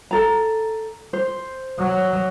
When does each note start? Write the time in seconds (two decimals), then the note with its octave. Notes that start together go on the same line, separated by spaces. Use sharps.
0.11 A4 A#5
1.13 C5
1.79 F#3